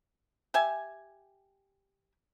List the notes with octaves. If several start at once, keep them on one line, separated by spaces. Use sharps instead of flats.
G4 E5 G#5